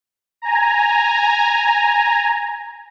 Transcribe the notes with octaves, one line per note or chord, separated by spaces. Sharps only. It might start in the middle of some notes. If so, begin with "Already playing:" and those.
G#5 A#5